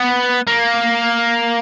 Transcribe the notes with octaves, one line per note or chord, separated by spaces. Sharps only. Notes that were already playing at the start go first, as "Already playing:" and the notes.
Already playing: B3
A#3